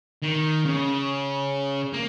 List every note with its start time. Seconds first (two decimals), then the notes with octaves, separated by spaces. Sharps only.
0.23 D#3
0.65 C#3
1.93 A#3